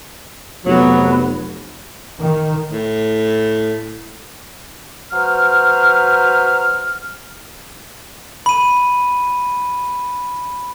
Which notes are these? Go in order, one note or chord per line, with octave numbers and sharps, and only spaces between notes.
F1 F#3 B3
D#3
A2
F#3 B4 C5 F6
B5 D#7